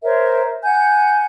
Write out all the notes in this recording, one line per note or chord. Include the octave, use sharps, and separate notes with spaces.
A#4 C5 C#5 E5
F#5 G#5 G6